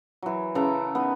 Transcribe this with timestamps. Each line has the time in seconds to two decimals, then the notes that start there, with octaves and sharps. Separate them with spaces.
0.22 E3 F#3
0.55 C#3 E3 A4 A#5
0.95 B3 D#4